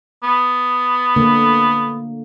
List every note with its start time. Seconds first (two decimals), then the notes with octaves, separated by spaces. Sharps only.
0.23 B3
1.16 D3 A#3